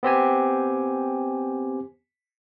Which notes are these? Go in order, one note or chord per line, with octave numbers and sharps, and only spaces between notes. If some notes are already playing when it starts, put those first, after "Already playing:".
B3 C4 G4 G#5